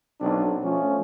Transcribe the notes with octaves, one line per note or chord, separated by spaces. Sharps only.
B1 C4 D4
F3 A3 C#4